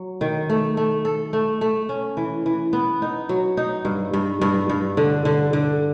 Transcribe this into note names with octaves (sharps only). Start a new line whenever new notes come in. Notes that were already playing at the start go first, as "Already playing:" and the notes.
Already playing: F#3
D#3
A3
A3
A4
A3
A3
C#4
E3
E3
B3
D#4
F#3
D#4
G2
G2
G2
G2
D3
D3
D3